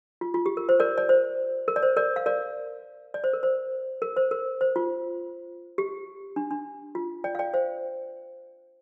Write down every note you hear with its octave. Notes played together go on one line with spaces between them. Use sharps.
F4
F4
G4
A#4
C5
A#4 D5
D5
C5
A#4
D5
C5
A#4 D5
F5
A#4 D5
D5
C5
A#4
C5
A#4
C5
A#4
C5
F4
G4
D4
D4
F4
D5 G5
F5
D5 G5
C5 F5